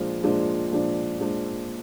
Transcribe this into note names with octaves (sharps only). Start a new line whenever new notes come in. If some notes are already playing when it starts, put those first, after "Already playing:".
Already playing: A#2 F3 G#3 D4
A#2 F3 G#3 D4
A#2 F3 G#3 D4
A#2 F3 G#3 D4